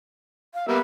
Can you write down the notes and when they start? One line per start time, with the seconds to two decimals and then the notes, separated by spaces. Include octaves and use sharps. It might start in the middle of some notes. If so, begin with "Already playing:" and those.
0.54 F5
0.68 G3 A#3 B3 E5